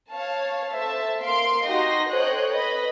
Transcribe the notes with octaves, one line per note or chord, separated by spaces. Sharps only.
C#5 F5 A5
A3 C5 E5 A5
A#3 F5 C6 C7 D7
D#4 F#4 G4 D#5 C6 A#6
A4 C5 C#5 D#5 G5 F#6
B4 D#5 B5